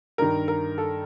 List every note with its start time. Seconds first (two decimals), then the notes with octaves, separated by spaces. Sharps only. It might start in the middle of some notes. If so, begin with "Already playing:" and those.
0.18 G2 D#3 A#4
0.48 A#4
0.78 A4